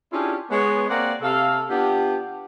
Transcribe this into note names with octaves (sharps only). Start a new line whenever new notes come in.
C#4 D4 E4 F4 G4 G#4
G#3 B3 C#5
A#3 C4 D5 F#5
C3 A4 F5
B3 D4 F4 G4